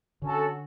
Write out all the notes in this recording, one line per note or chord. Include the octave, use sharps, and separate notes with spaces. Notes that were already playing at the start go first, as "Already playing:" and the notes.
D3 C#4 F#4 A4